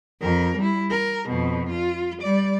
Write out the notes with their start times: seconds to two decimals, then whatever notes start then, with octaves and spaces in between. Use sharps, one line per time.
0.21 F2 A#4
0.57 G3 E4
0.90 A#4
1.29 F2 B2
1.69 F4
2.22 G3 D5